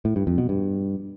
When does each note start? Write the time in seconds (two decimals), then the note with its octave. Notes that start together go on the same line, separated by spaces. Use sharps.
0.05 A2
0.16 G2
0.27 F2
0.38 B2
0.49 G2